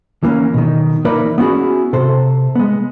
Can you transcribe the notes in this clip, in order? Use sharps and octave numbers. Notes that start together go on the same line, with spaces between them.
E3 A#3 C4 C#4
B2 D#3
E3 A#3 D#4 A#4 B4 D5
B3 C#4 E4 F#4 G#4
C3 A4 C5
G#3 B3